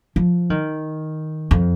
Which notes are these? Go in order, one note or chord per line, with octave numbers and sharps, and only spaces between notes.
F3
D#3
F2